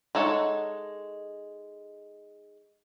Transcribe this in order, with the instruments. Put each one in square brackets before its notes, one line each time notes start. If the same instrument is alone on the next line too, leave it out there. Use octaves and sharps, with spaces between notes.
[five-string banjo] G#3 D#4 A4 C#5 F#5